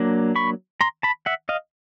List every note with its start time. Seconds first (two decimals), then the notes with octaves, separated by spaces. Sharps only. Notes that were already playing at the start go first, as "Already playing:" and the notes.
Already playing: F#3 A#3 D4
0.36 B5 C#6
0.81 A#5 C6
1.03 A5 B5
1.26 E5 F#5
1.49 D#5 F5